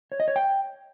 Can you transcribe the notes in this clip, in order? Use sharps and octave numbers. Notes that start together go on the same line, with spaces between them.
C#5
D#5
C#5
G5